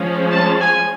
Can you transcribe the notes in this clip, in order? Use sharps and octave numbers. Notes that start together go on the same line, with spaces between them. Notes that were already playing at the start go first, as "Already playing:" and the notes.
Already playing: F3 G#3 C#4
A5
G#5